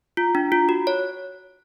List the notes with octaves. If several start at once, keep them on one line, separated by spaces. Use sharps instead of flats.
F4
D4
F4
F#4
C#5